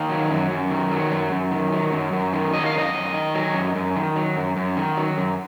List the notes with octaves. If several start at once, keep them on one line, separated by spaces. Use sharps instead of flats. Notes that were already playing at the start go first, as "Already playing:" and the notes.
Already playing: D#3 F5
F#3
F#2
F#2
D#3
F#3
F#2
F#2
D#3
F#3
F#2
F#2
D#3
F#3 D#5
F5
F#2 D#5
F#2
D#3
F#3
F#2
F#2
D#3
F#3
F#2
F#2
D#3
F#3
F#2